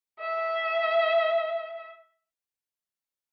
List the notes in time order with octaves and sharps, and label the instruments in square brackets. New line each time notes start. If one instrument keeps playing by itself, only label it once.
[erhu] E5